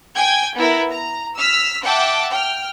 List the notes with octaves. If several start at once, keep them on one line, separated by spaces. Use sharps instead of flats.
G5 G#5 G#6
B3 E4 A#4
A#5
E6 F6 B6
E5 F#5 G5 A5 D6
G5 F6